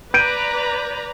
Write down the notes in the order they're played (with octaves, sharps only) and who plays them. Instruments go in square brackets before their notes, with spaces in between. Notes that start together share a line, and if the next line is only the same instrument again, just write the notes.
[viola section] B4 D5 A#5 [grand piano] G6 D7 D#7